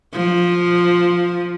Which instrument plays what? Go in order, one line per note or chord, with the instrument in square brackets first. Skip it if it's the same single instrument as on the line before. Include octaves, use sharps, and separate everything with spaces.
[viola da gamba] F3